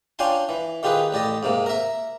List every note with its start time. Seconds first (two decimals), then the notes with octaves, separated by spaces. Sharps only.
0.19 C#4 D4 F4 G5 G#5 C6
0.49 E3
0.83 D#3 F4 G4 G#4 B4
1.13 A1 G4 D5 D#5
1.43 G#2 C3 A#3
1.66 A#4 E5